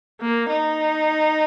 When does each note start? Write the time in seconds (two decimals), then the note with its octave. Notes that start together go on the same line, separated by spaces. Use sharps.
0.21 A#3
0.49 D#4